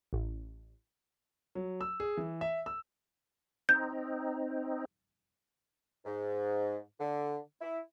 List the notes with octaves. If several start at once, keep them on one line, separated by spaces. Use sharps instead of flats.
A1
F#3
E6
G#4
E3
E5
E6
C4 D#4 G6
G#2
D3
E4